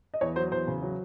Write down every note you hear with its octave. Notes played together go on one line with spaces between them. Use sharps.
D#5
E2 C#5
F#3 C5
E2 C5
C#3
F#3